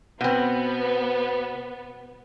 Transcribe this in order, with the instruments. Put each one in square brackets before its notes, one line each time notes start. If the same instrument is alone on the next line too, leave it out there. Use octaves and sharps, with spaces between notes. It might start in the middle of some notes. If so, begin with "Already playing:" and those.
[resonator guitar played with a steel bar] B2 C4 [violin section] B3